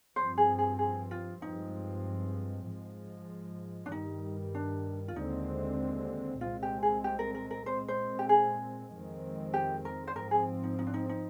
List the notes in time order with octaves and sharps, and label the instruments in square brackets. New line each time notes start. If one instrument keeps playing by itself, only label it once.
[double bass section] G2 F3 C4 [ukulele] C5
[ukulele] G#4
G#4
G#4
F4
[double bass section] G2 F3 G#3 C4 [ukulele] D#4
[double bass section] G#2 F3 G#3
[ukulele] D4
[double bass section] G2 D#3 G3 [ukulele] D#4
[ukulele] D4
F4
[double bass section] D#2 D3 G#3 C4 [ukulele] D#4
[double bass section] C2 A#2 G#3 C4 [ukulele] F4
[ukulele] G4
G#4
G4
A#4
A#4
A#4
[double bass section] A#2 G#3 C4 [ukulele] C5
[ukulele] C5
G4
G#4
[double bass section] F2 D#3 G#3 C4
[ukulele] G4
A#4
C5
[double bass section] G#2 F3 C4 [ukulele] A#4
[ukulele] G#4
D#4
D#4
D4
D#4
D#4